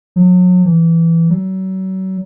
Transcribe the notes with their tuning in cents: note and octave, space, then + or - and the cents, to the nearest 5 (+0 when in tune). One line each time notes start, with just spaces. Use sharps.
F#3 -35
E3 +10
F#3 +35